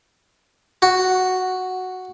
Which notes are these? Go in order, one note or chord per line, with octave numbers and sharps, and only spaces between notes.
F#4